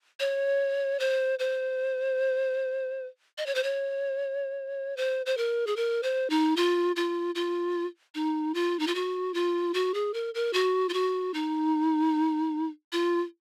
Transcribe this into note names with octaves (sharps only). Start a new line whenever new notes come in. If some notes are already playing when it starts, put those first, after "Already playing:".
C#5
C5
C5
D#5
C#5
C5
C#5
C5
C5
A#4
G#4
A#4
C5
D#4
F4
F4
F4
D#4
F4
D#4
F4
F#4
F4
F#4
G#4
A#4
A#4
F#4
F4
F#4
D#4
F4